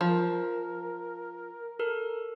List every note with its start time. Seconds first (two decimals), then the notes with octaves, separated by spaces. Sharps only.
0.01 F3 A#4
1.79 A4 A#4